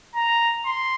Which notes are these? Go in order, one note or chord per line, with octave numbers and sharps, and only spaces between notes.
A#5
C6